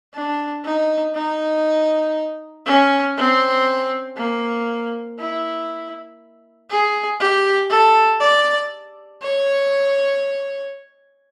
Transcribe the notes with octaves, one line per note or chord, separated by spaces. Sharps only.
D4
D#4
D#4
C#4
C4
A#3
E4
G#4
G4
A4
D5
C#5